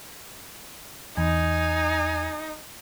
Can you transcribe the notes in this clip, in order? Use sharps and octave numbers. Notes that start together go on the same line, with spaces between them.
E2 D#4 G#5